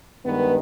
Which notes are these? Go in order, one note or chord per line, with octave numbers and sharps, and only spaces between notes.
G2 D#3 G#3 B3 B4